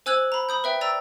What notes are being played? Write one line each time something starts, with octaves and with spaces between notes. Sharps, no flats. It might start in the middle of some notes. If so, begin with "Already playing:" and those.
C5 G#5 E6 F#6 G#6 F#7
A#5 B5
B5 D#6 G6
B4 E5 G5
D5 G5 A#5 E6